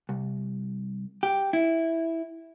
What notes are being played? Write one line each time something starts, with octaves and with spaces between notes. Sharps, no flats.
C2
G4
E4